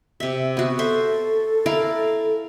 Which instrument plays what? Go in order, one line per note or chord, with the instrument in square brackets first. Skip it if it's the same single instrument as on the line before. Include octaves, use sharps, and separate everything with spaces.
[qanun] C3 E5
B3 F#4
[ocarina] A4 [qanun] C5 E5
[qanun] E4 A#4 F5